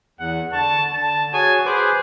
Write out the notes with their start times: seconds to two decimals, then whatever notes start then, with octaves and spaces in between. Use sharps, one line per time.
0.19 E2 F#5
0.53 D3 A5 C#6
0.93 D3 A5
1.33 F#4 G#4 C#5 G#5
1.66 G#4 B4 C5 D6